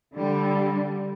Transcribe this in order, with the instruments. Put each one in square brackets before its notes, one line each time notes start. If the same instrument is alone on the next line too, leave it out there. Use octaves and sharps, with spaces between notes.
[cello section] D3 G3